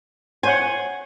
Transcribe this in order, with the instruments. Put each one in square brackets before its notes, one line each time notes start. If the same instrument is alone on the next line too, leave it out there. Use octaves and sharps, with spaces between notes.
[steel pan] C5 C#5 F#5 [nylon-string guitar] G#5